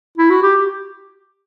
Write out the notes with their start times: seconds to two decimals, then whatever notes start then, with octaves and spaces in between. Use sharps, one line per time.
0.18 E4
0.30 F#4
0.43 G4